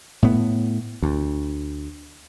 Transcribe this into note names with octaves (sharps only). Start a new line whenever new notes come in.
A2 B3
D2